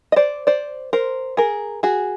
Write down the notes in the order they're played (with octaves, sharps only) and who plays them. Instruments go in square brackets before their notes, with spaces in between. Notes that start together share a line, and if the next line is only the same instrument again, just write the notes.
[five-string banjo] D#5
C5 D5
C5 D5
A#4 C5
G#4 A#4
F#4 G#4